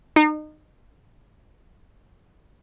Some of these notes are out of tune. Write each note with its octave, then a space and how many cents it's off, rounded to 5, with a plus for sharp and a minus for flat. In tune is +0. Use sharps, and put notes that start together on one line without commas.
D#4 -30